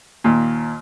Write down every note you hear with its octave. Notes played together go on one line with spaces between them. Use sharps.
D#2 A#2